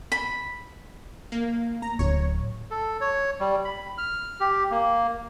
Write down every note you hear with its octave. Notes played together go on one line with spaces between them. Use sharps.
B5
A#3
A#5
D1 C#5
A4
C#5
G3
B5
F6
G4
A#3